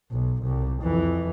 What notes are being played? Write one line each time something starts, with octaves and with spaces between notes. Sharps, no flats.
B1
C2
F2 E3